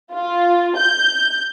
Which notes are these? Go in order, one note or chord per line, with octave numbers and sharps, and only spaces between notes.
F4
G6